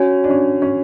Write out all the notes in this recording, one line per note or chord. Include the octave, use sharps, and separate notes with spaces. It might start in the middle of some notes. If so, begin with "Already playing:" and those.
Already playing: C#4 F#4 C#5 G#5
D4
C#4
C#4